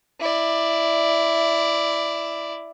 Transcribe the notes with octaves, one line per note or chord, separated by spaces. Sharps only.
E4 D5